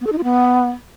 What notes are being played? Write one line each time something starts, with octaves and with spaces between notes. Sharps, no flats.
B3
A4
D#4
F4
B3